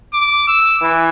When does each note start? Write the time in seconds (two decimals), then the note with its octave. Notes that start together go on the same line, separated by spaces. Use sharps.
0.13 D6
0.48 E6
0.80 E3